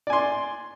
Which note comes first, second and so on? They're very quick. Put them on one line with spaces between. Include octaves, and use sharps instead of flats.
D5 G#5 C6